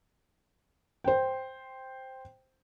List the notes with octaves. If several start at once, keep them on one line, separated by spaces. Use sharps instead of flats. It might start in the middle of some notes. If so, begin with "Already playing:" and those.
C5 G5